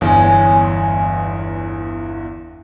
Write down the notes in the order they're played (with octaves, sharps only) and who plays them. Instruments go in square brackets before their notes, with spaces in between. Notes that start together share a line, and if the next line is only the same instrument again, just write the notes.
[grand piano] G1 E2 [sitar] G#3 C#4